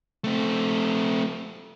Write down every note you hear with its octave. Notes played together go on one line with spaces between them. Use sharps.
A3 C4